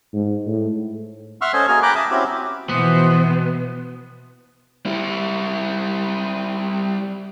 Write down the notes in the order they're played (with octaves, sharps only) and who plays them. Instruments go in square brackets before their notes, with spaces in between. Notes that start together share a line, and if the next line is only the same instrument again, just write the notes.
[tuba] G#2
A2
[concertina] E5 F#5 C6 C#6 E6 F6
C#4 A4 C5 D#5 G#5
A#3 F#4 G#4 G#5 F6
G5 A#5 B5 D6 F#6
E5 A5 D#6
C4 C#4 E4 F#4 G4
[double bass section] B2 [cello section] E3 F3 C5 [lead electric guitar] B3
[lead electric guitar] G3 E4